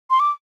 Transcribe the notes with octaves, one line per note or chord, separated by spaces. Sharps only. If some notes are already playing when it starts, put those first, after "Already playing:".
C6
D6